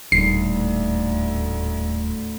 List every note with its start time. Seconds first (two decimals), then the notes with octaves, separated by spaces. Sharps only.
0.12 D#1 D2 A2 C7